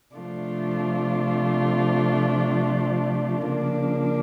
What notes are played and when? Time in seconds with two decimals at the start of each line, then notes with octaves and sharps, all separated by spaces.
0.15 C3 F3 A3 D4 F4
3.48 C#3 F3 A#3 D4